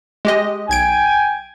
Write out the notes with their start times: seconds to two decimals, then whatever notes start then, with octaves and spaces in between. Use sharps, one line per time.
0.25 G#3 G4 D#5
0.69 B1 G5 G#5 G#6 D7